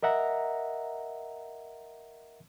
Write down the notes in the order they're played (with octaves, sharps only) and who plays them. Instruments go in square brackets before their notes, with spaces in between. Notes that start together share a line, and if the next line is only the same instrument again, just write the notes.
[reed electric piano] A#4 D#5 E5 F#5 A#5